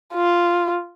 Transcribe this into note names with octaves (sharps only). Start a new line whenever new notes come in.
F4